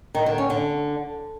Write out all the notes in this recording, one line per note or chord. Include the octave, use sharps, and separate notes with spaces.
D#3
D3
C#4
D3